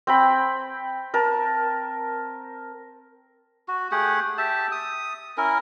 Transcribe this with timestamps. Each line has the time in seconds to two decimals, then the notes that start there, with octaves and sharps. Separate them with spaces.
0.07 C4 G5 B5
1.14 A#4 A5
3.68 F#4
3.91 A3 G4 G#4 F#5
4.38 G4 E5 A5
4.72 D#6
5.38 C#4 E4 A#4